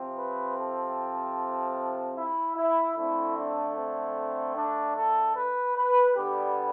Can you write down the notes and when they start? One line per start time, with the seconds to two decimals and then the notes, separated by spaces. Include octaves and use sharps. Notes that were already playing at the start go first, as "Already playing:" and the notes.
Already playing: C3 F3 C4
0.16 B4
0.56 A4
2.16 E4
2.56 E4
2.96 D3 A3 C4 E4
3.36 D4
3.76 C4
4.55 D4
4.96 A4
5.35 B4
5.76 B4
6.15 D3 G3 B3 G4